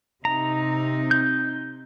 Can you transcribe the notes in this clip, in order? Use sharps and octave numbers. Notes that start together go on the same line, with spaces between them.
C3 D#4 A#5
G6